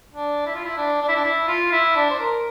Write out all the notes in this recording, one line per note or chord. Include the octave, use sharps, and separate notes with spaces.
D4
E4
F4
E4
D4
D4
E4
D4
E4
F4
E4
D4
C5
A#4